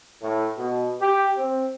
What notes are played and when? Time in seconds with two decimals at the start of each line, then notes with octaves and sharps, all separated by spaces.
0.20 A2
0.55 B2
1.00 G4
1.36 C4